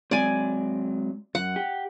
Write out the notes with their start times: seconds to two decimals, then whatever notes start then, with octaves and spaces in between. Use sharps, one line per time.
0.11 F#3 G#3 C4 D5 G#5
1.35 F#2 F#5
1.56 G4